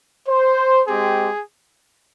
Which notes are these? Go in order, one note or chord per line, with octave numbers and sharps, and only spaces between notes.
C5
G#3 C4 G4 G#4